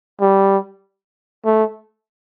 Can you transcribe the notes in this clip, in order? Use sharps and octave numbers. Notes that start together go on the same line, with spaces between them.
G3
A3